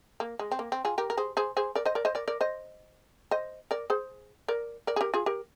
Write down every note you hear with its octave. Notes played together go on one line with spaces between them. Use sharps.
A#3
G#3
C4
A#3
C4
F4 G#4
G4 A#4
A#4
G#4 C5
G#4 C5
G#4 C5
A#4 D5
C5 D#5
A#4 D5
C5 D#5
A#4 D5
A#4 D5
C5 D#5
C5 D#5
A#4 D5
G#4 C5
A#4 D5
A#4 D5
G#4
G4 A#4
F4 G#4
G4 A#4